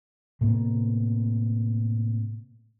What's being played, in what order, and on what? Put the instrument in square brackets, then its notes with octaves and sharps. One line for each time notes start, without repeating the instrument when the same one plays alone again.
[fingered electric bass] A2 C3 A#3 B3